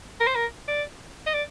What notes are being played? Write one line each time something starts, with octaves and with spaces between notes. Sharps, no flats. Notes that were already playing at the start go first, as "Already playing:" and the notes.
A#4
C5
A#4
D5
D#5
D5